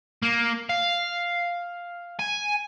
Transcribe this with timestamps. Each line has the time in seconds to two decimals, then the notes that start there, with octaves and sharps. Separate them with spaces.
0.22 A#3
0.69 F5
2.20 G#5